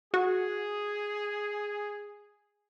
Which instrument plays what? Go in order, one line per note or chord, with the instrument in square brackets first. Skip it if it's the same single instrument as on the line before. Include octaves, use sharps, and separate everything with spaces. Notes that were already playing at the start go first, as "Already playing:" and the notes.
[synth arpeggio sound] F#4 [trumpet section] G#4